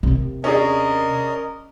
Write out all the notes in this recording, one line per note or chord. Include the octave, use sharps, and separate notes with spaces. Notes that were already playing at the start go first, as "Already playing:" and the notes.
D#2 C3
C#4 D4 G#4 A#4 D#5